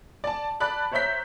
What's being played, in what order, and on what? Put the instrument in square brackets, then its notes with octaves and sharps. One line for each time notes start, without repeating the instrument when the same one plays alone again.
[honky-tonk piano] D5 A5
D5 A5 B5 F#6
C5 C#5 E5 A#5 G6 B6